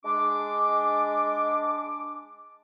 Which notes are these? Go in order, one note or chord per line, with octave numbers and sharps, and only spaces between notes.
G#3 D4 D6